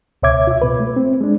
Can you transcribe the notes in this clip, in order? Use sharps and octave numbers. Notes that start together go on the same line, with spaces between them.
C#2 B2 C#5 E5 D6 G#6
F4 E5
B2 B4
A3
C4
G#3 D4